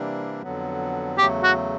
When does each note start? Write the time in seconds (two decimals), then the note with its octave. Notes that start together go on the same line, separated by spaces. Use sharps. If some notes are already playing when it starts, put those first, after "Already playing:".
Already playing: C3 E3 G3 A#3 D4
0.43 F2 D3 F#3 B3
1.18 E2 C#3 F#3 A3 G4
1.44 F#4